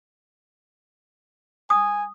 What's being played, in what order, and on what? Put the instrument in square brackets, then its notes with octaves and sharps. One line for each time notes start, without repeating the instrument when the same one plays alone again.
[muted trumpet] G#5 [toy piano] D#6